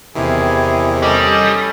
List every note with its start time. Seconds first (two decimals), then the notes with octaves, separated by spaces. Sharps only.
0.15 E2 C3 D#3 E4 G4 G#4
1.03 G3 C#4 A4 D#5